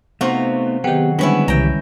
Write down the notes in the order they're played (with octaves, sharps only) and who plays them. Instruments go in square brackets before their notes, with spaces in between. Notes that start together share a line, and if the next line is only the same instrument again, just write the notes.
[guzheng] C3 F4 F#4 [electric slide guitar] A3 B3 D#4
[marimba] D#3 G5 [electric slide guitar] F#3 G#4 F#5 [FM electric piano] B3 G4
[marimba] D3 G3 G#3 [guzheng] B3 C#4 E4 [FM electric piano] D4
[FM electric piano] C2 E3 [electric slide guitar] C#3 G4 [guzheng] G5 A#5